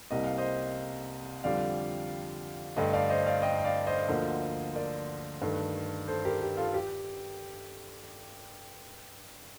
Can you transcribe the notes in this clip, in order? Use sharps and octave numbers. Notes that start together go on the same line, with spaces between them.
C2 C3 G3 A#3 D#5
F5
C5 D#5
F2 D3 G3 D5 F5
G2 D3 A3 D#5 G5
D5 F5
C5 D#5
D5 F5
D#5 G5
G5
D5 F5
C5 D#5
D2 D3 F3 A#3
A#4 D5
G2 D#3 A3
A4 C5
G4 A#4
G4
F4 A4
G4